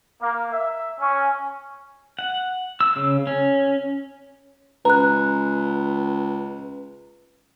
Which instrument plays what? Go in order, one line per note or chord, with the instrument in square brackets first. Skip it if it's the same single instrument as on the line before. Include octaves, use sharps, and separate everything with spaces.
[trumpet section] A#3
E5
C#4
[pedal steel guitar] F#5
E6
C#3
C#4
[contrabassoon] C#2 [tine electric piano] B4 [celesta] A#5 F#6